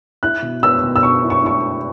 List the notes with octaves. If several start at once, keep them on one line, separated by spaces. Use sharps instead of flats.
E4 F#6
B2
B3 E6
B2
E6
B2 C#6
E4
C#6
E4 C#6